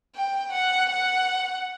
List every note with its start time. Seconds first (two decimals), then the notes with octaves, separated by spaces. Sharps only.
0.16 G5
0.53 F#5
0.90 F#5